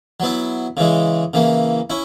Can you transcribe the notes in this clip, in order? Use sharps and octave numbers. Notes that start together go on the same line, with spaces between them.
F#3 B3 E4
C#3 E3 G#3
C#3 E3 A#3
C#4 E4